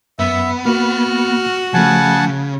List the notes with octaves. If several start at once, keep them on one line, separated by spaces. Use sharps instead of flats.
F#2 B3 E5
A#3 F#4 F6
C#3 F3 A3 F#5 G#5 A5